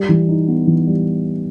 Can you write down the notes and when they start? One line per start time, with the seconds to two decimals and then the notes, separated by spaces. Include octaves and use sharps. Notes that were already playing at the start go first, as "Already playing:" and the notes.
Already playing: G3
0.09 E3
0.29 D#4
0.48 B3
0.67 E3
0.87 G3